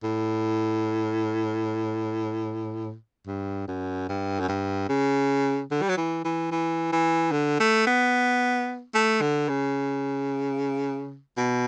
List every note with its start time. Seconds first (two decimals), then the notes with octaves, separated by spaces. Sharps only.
0.03 A2
3.27 G2
3.68 F#2
4.09 G2
4.40 F#2
4.49 G2
4.89 C#3
5.71 D3
5.82 G3
5.89 F#3
5.97 E3
6.24 E3
6.51 E3
6.92 E3
7.32 D3
7.60 A3
7.86 B3
8.95 A3
9.21 D3
9.49 C#3
11.38 B2